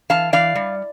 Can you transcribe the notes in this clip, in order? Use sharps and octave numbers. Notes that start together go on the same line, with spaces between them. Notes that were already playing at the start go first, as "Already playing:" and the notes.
E3 F5 A5
E3 D5 F5
G3